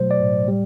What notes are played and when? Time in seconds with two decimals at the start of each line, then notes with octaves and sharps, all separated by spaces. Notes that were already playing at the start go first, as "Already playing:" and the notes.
Already playing: B2 F#3 A3 C5
0.11 D5
0.20 A2
0.48 G3